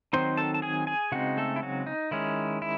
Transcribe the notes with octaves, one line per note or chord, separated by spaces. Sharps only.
D#3 F#3 C4 D#4 C5 C6
A4 A5
A5
G#4 G#5
G#4 G#5
C#3 G#3 C4 D#4 F#4 F#5
A3 A4
E4
F#3 F#4
D#4
D#3 G#3 C#4 E4
E4